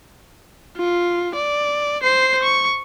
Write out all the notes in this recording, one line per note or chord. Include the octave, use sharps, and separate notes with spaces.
F4
D5
C5 C7
C#6